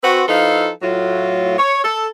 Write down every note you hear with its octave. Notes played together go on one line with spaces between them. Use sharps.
C4 F#4 B4
F3 D#4 E4 A4 B4 F5
A2 F#3 F4
C#5
A4